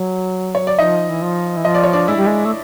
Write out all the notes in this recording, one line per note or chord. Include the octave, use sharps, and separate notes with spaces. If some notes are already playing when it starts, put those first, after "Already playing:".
Already playing: F#3
C#5
D5
F3 D#4 D#5
E3
F3
E3
F3 D#5
D5
C#5
D4 D5
G#3 E4 E5
G3
G#3
A3